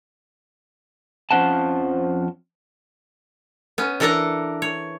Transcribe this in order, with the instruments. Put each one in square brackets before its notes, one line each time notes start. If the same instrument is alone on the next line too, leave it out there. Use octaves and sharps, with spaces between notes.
[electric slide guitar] F2 F3 C#4 C5 F#5 A5
[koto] B3 C#4
E3 D4 A4 A#4 A5 A#5
C#5